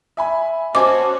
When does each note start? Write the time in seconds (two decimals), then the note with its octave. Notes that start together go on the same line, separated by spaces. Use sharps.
0.17 E5 G#5 B5
0.75 C#4 F#4 C5 D#5 G#5 A5 D6